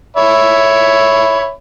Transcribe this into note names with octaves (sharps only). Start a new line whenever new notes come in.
C#5 E5 B5